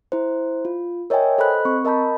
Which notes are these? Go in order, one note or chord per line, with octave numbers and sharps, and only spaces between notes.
E4 C5
F4
A#4 C#5 D#5 E5 G5 G#5
A4 C5 D#5 B5 F#6
C4 C#6
A#4 D#5 A5 B5 G6